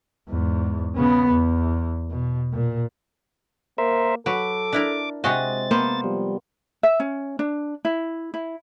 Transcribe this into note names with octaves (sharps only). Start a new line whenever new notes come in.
E2 G#2
C#3 B3
E2
B2
A#2
A#3 A#4 C5 E5
F#3 A4 B4 D6
D4 E4 A#4
C3 G#3 C4 F#4 D#5 A6
A#3 B3 C5
F3 G3
E5
C#4
D4
E4
E4